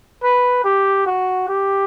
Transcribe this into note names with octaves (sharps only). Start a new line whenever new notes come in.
B4
G4
F#4
G4